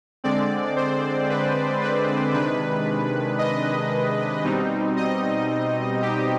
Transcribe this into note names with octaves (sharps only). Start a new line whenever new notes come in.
D3 G#3 C4 D5
C5
B4
B4
C3 D#3 G#3 D4 B4
D#5
B2 G3 C4 D#4
D#5
G4